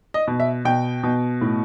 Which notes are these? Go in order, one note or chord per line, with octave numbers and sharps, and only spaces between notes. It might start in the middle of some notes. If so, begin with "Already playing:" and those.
D#5
B2
E5
B2 G5
B2
A2